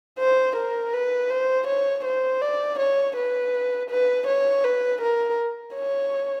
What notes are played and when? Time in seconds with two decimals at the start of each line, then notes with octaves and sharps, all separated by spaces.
0.19 C5
0.56 A#4
0.93 B4
1.30 C5
1.67 C#5
2.05 C5
2.41 D5
2.79 C#5
3.16 B4
3.90 B4
4.27 C#5
4.64 B4
5.01 A#4
5.76 C#5